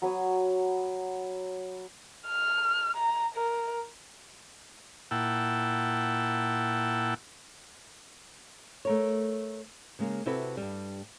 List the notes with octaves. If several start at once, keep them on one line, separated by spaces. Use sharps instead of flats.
F#3 B4 C#5 D#6
F6
A#5
A#4
A#2 E4 F#5 G5 A5 E6
A3 A#4 C#5
C#3 G#3 A#3
C3 C4 E4 F#4 A4 B4
G2 G3